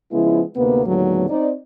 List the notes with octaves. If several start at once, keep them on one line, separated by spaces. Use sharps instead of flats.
C#3 F3 G#3 B3 E4
D2 C3 A#3 B3
D#2 A2 D3 F#3 G#3 B3
C4 D#4 D5